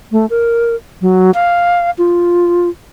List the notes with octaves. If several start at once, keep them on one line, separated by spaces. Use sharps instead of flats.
A3
A#4
F#3
F5
F4